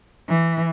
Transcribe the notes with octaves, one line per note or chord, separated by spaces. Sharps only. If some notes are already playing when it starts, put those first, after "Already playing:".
E3